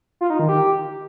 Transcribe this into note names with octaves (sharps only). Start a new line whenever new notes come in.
F4
D#4
D#3
G4